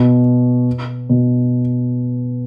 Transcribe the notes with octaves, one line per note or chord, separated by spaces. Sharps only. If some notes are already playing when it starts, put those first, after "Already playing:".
Already playing: B2
B2